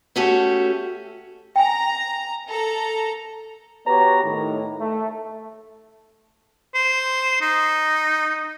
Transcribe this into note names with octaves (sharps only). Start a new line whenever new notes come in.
A3 C#4 F#4 G4 A4
G5 G#5 A#5
A4 A#5
B3 F#4 G4 B4 C#5 A#5
A2 D#3
A3
C5
D#4